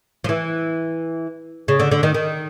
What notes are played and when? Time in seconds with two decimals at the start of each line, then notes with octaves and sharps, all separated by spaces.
0.24 F3
0.29 E3
1.68 C#3
1.80 D3
1.91 D3
2.03 D#3
2.14 D#3